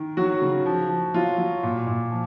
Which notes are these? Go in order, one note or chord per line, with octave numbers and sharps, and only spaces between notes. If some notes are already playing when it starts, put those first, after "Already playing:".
Already playing: D#3
F#3 F#4
C#3
F3
F3
F#3 F4
F#3
A#2
A#2
F3